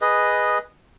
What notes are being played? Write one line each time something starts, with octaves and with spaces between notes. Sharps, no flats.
G#4 B4 D#5